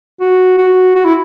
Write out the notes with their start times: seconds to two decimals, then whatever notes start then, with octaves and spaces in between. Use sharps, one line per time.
0.20 F#4
0.58 F#4
0.95 F#4
1.05 E4